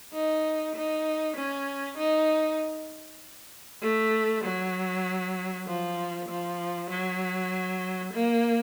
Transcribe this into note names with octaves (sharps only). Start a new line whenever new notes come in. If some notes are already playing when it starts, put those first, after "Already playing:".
D#4
D#4
C#4
D#4
A3
F#3
F3
F3
F#3
A#3